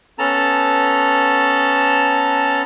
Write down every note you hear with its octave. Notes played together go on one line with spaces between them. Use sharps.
B3 C#4 A4 A5 A#5